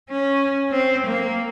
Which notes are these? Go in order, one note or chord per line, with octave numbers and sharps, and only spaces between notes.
C#4
C4
A#3